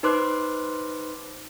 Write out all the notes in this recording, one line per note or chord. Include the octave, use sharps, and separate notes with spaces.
D#4 B4 C5 C6 D6 F#6